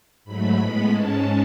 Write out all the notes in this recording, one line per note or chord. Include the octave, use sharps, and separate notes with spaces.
G#2 F#3 A3 B5
A2 G#3 B3 B5
G#2 G#3 C#4 A5